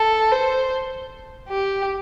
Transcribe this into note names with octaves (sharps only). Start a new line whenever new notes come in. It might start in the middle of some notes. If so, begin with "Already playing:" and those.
Already playing: A4
C5
G4